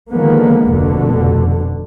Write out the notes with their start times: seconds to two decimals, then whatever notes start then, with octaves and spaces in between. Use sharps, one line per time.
0.11 D3 D#3 F3 G#3 A#3 B3
0.69 F1 D2 B2 D3